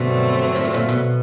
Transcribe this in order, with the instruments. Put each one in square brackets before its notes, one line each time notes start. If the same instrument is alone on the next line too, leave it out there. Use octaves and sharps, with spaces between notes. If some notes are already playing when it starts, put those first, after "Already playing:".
Already playing: [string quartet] G2 D3 F#3 A3 C4 [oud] B2
[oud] A#2
A2
A#2
B2